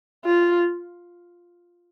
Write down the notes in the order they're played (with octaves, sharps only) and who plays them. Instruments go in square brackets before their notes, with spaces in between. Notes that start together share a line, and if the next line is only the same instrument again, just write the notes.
[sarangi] F4